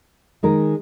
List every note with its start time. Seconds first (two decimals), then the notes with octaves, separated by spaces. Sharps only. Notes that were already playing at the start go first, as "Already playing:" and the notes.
0.43 D#3 G#3 D#4 A#4